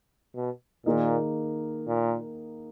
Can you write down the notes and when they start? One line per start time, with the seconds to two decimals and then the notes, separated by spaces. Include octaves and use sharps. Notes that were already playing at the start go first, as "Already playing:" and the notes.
0.35 B2
0.86 A#2 D#3 A#3 D#4 G#4 D#5
1.87 A#2